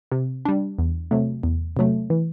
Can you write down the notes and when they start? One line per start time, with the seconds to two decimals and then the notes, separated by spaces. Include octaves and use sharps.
0.12 C3
0.45 G3 D4
0.79 E2
1.11 C3 F#3 A3
1.43 E2
1.77 C3 F#3 A3
2.10 E3